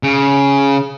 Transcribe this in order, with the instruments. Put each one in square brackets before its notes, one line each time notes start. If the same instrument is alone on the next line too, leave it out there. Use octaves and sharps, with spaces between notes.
[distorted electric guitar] C#3